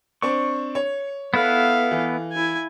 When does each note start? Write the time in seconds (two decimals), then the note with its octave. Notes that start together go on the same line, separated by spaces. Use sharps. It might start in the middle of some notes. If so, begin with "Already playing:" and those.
0.22 C4 D4 C#6
0.75 C#5
1.34 B3 E4 A4 B4 F5
1.91 E3
2.33 E4 G#5